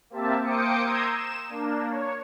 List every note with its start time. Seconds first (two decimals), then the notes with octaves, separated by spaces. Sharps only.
0.10 A#3 C4 G4 E5 A5
0.43 A#3 C5 G5 D6 D#6 C#7
0.85 A#5 C6 D#6 E6 G6 G#6
1.13 E7
1.50 A#3 D4
1.87 C#5